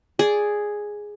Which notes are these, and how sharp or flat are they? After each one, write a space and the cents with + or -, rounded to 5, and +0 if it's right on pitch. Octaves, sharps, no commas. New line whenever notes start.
G#4 +0 D5 -10